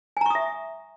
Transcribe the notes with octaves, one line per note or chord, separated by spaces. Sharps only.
E5 G#5 A#5 C#6 D#6